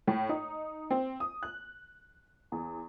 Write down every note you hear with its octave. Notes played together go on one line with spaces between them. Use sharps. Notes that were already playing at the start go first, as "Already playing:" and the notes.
A2
D#4
C4
D#6
F#6
E2